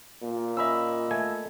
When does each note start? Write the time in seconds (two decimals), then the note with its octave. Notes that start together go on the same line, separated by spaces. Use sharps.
0.23 A#2
0.57 C#4 D#5 E5 B5 E6
1.11 A3 G#5